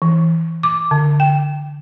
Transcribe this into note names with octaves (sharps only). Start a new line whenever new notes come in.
E3
D6
D3
G5